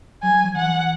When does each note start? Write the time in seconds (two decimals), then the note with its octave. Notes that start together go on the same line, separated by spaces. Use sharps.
0.23 F#3 G#5
0.34 F#3
0.45 F3
0.56 E3 F#5